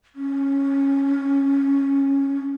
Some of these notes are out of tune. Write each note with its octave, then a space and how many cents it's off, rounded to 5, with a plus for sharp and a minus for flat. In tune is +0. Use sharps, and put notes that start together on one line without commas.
C#4 -10